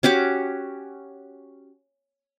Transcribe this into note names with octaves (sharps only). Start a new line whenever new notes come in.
C#4 F#4 G4 D6